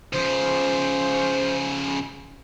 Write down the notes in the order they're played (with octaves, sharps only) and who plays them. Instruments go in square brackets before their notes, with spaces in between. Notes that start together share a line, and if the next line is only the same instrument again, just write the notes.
[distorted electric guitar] C#3 F3 [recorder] C5